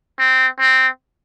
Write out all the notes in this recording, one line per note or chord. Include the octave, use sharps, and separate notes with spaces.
C4
C4